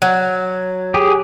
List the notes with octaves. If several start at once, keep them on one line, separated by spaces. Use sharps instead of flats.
F#3
G4 G#4